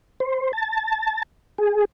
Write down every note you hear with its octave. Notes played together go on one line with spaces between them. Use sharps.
C5
A5
G#4